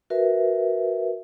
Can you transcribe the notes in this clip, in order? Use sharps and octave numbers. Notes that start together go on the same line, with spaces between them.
F#4 A#4 B4 E5